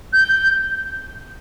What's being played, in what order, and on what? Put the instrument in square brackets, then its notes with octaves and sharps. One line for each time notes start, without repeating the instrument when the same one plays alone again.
[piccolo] G6